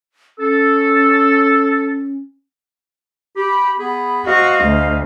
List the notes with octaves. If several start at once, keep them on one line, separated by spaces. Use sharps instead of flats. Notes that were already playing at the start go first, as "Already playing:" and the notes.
C#4 A4 E6
G4 B5
B3 G#4 B5
F#4 C5 D#5 F5
D2